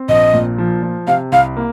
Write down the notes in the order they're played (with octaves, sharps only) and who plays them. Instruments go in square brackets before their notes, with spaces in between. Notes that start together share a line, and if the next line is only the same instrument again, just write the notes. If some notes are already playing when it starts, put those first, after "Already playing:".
Already playing: [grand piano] C4
[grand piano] A#1 [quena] D#5
[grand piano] A#2
F3
F3
[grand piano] C3 [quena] F5
[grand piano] C2 [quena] F5
[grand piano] A#3